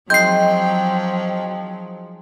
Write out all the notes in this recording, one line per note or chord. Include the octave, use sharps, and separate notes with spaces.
F3 F#3 G#3 C4 D#4 G5 G6 C7